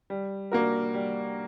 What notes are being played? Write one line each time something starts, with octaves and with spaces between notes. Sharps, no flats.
G3
A#3 D4 F#4 A#4
G3